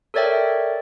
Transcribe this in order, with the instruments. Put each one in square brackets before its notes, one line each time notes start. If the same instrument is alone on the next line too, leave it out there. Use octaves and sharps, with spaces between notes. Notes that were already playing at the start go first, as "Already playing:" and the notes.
[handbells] A4 A#4 C#5 D5 E5 G5